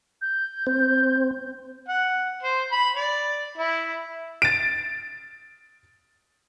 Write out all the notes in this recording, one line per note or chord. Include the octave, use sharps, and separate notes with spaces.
G6
C4 C5
F#5
C5
B5
D5
E4
A6 D7